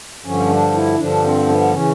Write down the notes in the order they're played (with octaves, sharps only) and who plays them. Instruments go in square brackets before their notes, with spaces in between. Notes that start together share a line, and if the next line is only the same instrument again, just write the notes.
[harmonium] G2 D3 F3 C#4
D4
E4
G2 D3 F3 D4
C4
B3
C#3 E3 C#4